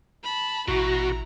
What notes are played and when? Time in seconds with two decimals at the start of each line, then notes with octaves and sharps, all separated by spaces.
0.24 A5 B5
0.68 A1 B2 E4 F#4 A#5